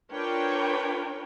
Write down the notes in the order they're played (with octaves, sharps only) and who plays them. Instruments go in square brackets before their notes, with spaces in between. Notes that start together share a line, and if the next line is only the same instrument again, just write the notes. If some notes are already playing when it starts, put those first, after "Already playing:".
[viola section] D4 F4 A#4 B4 C#5 G5